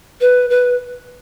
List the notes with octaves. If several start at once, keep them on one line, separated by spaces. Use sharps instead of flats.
B4
B4